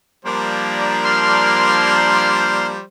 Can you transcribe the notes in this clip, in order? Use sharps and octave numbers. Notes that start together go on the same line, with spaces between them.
F3 G3 A#3 D4 C5
C6 F6